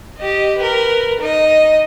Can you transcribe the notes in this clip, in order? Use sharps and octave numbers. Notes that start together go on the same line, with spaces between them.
G4 D#5
A#4 B4
D#4 D#5